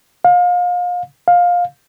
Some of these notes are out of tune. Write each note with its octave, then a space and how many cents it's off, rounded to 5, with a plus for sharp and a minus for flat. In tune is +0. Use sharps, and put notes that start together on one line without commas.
F5 +35
F5 +20